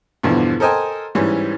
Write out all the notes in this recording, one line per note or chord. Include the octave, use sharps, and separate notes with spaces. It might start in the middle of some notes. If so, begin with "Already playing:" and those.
E2 G2 B2 D3 E3 F3
A4 A#4 C5 D#5 G5 G#5
G#2 E3 G3 C#4